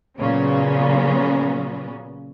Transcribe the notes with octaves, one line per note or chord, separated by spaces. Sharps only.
A#2 C#3 F#3 B3 C#4